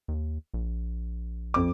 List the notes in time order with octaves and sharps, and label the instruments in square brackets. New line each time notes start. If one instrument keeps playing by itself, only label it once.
[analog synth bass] D#2
A#1
[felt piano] F2 D6